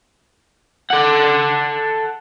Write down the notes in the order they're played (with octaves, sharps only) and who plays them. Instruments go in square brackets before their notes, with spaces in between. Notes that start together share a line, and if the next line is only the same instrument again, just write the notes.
[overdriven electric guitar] A4 F#5